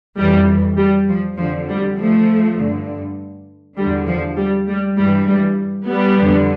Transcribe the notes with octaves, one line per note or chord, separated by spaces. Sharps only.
F2 E3 G3
G3
F3
F2 D3 F3
G3
F3 A3
G2 D3
E2 D3 G3
F3
G3
G3
G2 E3 G3
G3
G3 B3
F2 D3